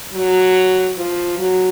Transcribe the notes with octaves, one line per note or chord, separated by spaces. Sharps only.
F#3
F3
F#3